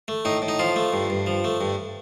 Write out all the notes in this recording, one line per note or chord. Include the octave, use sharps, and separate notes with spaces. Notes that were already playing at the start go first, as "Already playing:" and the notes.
A3
A2 D#4
A2
D#4
F3 F4
A3
G2
G2
F3
A3
G2